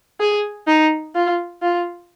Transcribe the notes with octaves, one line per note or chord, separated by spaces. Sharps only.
G#4
D#4
F4
F4